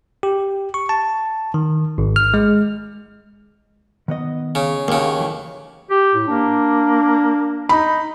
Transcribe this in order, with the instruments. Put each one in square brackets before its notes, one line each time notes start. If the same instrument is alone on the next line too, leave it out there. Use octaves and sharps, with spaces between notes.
[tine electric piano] G4
C#6
A5
D#3
G#1
F6
G#3
[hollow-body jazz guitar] D#3 B3 D#5
[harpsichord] C#3
[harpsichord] D#2 C#3 [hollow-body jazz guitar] A#3 F#4
[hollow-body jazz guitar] E3 A3
[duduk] G4
[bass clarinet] A2
[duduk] A#3 [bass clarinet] D4
[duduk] D#4 [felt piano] B5